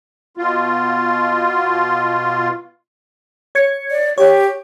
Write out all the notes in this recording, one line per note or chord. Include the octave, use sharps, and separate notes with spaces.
B2 F4
C#5 G#6 C#7
D5
G4 C#5